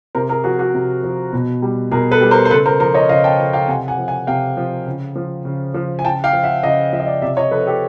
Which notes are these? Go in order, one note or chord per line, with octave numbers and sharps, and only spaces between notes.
C3 A#4 C5
G#4 A#4
F3 F#4 G#4
F#4 G#4
C3
F3
B2
G3
B2 G#4 A#4
A4 B4
G3
A#4 C5
C5
C#3 A4 B4
A#4 C5
F3 A#4 C5
C#5 D#5
C#3 D#5 F5
G5 A5
F3
F5 G5
C3 F#5 G#5
F#5 G#5
F3
F#5 G#5
C3 F5 G5
F3
C#3
F3
C#3
F3
G#5
C#3 G5 A5
F5 G5
F3
E5 F#5
C#3 D#5 F5
F3 E5
D#5
D5 E5
C3 D5 E5
C#5 D#5
F3 A4 B4
G4 A4